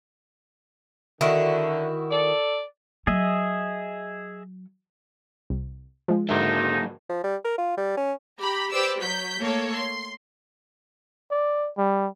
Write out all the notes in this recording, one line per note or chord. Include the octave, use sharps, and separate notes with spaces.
D3 D#3 E4 F#4
A4 D5
F#3 G#4 D#5 E5
C2
F3 G#3
G#2 D3 F#3 A#3 D#4 E5
F3
G3
A#4
F4
G3
C#4
G4 A#5 B5
G4 B4 C5 D5 D6 E6
F#3 G6 B6
A3 A#3 A4 C#5
C6
D5
G3